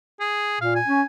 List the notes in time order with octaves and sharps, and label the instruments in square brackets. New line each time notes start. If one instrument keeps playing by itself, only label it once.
[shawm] G#4
[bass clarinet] A#2 [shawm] F5
[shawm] G#5
[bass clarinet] C#4